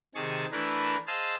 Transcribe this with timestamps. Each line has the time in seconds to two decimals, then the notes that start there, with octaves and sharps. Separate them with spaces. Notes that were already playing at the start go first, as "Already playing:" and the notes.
0.15 C3 D#3 G#4 A5 C#6
0.52 E3 A3 D4 E4 A#4 B4
1.07 G#4 C5 D#5 F5 A5 E6